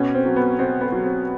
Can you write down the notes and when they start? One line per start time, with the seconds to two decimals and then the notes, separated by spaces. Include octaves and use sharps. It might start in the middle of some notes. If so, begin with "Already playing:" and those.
Already playing: B2 C#4
0.14 C4
0.25 F#3
0.36 B3
0.59 B2 C4
0.81 B3
0.92 F#3
1.04 C4